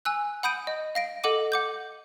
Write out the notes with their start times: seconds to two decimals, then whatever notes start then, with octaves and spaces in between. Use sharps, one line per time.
0.05 G#5 E6 F#6
0.43 F#5 B5 D#6 G6 D7 D#7
0.67 D#5
0.95 F5 A#6 D7
1.24 A4 D#5 F#5 D6 D#7
1.52 F#5 D6 G6